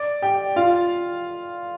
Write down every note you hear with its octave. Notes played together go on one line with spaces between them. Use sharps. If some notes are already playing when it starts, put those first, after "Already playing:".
Already playing: D5
G4 G5
F4 F5